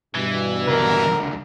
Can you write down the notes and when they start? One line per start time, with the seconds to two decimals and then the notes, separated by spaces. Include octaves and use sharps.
0.15 G2 B2 E3
0.68 C#2 D3 A#4